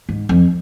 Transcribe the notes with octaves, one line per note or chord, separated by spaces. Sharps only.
G#2
F2